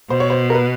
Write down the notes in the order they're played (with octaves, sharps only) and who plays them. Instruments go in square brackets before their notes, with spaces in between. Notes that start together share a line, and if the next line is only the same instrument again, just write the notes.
[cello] B2 [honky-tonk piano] C5
[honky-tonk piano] C#5
C5
A#4
B4